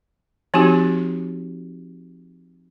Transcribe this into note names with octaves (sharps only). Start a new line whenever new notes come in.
F3 C4 D#4 F#4 G4